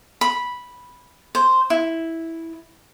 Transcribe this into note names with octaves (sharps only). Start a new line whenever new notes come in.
B5
C5
E4